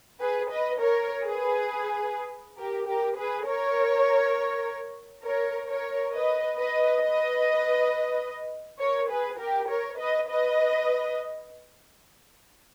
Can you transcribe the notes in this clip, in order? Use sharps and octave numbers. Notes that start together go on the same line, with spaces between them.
G#4 B4
B4 D#5
A#4 C#5
G#4 B4
G4 A#4
G4 A#4
G#4 B4
A#4 C#5
A#4 C#5
A#4 C#5
B4 D#5
B4 D#5
B4 D#5
A#4 C#5
G#4 B4
G4 A#4
A#4 C#5
B4 D#5
B4 D#5